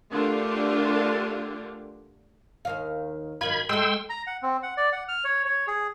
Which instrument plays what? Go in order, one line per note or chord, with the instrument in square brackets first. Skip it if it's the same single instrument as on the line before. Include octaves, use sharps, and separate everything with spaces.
[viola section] D3 A3 D4 F4 G4 A#4
[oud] D#2 D#3 F5
[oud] F#2 D#3 F4 [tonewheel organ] B5 G#6
[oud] G#3 A3 [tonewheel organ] G5 C6 E6
[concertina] A#5
F#5
C4
F#5
D5
F#5
F6
C#5
C#5
G#4